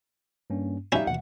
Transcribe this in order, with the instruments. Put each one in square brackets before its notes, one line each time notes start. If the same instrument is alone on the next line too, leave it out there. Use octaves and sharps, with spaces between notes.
[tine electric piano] G2 A#3 C#4
[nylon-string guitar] G3 D#4 E5 [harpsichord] C#4 E4 [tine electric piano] F5 G6
[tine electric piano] D#2 B2 E3 [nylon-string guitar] F#5